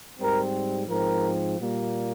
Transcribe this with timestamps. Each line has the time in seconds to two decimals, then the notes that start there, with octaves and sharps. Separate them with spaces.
0.19 G#2 G3 C4 A#4
0.88 G#2 F3 C4 A#4
1.57 A#2 G3 A#3